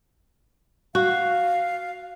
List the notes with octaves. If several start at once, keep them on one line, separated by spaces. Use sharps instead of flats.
F#4 F5